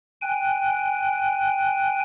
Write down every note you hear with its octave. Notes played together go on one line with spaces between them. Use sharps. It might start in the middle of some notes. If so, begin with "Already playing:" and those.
G5 G#5 F#6